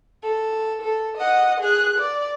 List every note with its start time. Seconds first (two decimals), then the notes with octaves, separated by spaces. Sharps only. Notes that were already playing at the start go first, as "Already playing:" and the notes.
0.23 A4
0.81 A4
1.17 D#5 F#5
1.60 G#4 F#6
1.98 D5